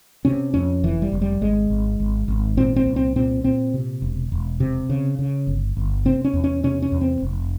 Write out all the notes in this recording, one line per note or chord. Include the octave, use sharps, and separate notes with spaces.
C3 C#4
F2 C#4
F1 E3
G3
F1
G3
G#1 G#3
G#1
G#1
G#1
A#2 C4
C4
C2
C4
A#2 C4
A#2 C4
C3
E1
E1
C3
C#3
C#3
G1
G1
C3 C4
C#4
E2
C#4
C3 C#4
C#4
E2
C4
F1